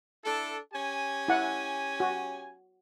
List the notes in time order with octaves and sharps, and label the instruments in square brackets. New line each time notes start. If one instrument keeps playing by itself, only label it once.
[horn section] D4 E4 A4
C#4 G4 G#5
[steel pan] E4 F#5
F#4